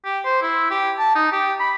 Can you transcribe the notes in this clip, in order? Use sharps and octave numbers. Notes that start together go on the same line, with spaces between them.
G4
C5
E4
G4
A5
D#4
G4
B5